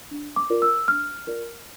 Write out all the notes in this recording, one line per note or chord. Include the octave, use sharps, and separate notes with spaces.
D4
D6
F4 A#4 D5
E6
D4 F6
F4 A#4 D5